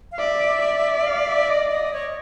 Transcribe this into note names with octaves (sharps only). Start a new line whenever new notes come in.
F5
D5 E5
D5
F5
E5
D#5
D#5
C#5